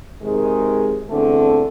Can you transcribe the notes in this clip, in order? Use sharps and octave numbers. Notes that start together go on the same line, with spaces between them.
C3 D#3 G#3
E2 D3 A3 C4 A4